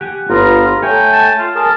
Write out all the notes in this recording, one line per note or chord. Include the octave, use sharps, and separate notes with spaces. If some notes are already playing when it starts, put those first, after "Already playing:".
G4 F#5 G#5
G1 B3 F4 A#5
A3 C#5 G5 G#5
A5
F4
G#4 A#4 A5